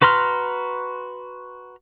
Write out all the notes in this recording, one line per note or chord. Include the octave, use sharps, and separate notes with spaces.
F#4 B4 A#5 C6 F6